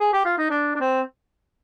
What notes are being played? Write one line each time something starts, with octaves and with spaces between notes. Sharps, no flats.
G#4
G4
F4
D#4
D4
D4
C4